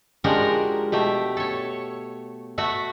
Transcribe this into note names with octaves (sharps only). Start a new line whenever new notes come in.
F3 G#3 D4 F#4 G4 A#4
B2 A3 G4 E5
A4 C#5
A3 F#4 E5